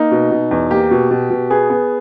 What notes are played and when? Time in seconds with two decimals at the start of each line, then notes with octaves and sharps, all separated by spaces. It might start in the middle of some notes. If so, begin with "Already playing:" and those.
Already playing: A#3 D#4
0.11 B2
0.31 B2
0.51 E2
0.70 A#3 G4
0.91 B2
1.11 B2
1.30 B2
1.50 B3 G#4
1.70 B3